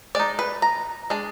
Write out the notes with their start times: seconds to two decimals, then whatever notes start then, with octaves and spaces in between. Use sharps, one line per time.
0.15 G#3 D#4 D5
0.39 B4
0.62 A#5
1.10 G#3 D4